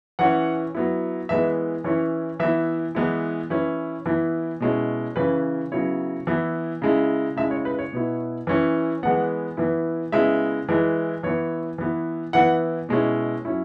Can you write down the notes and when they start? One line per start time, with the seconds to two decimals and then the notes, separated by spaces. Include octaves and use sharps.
0.19 E3 C#4 E4 F#5
0.75 F#3 B3 E4
1.29 E3 G#3 B3 E4 E5
1.84 E3 C#4 E4 C#5
2.40 E3 B3 E4 E5
2.95 E3 G#3 B3 E4
3.50 E3 C#4 E4 B4
4.06 E3 B3 E4
4.60 B2 G#3 C#4 E4
5.16 C#3 E3 C#4 E4 B4
5.72 C#3 F#3 B3 E4 C#5
6.27 E3 B3 E4
6.82 C#3 G#3 E4
7.36 C#3 G#3 E4 E5
7.51 C#5
7.65 B4
7.79 C#5
7.93 B2 B3 E4
8.47 E3 C#4 E4
9.03 E3 G#3 B3 F#5
9.57 E3 B3 E4
10.12 C#3 G#3 B3 E4 E5
10.69 E3 G#3 E4
11.23 E3 B3 E4 C#5
11.78 E3 B3 E4
12.33 E3 B3 E4 F#5
12.89 B2 G#3 C#4 E4
13.45 F#3 C#4 E4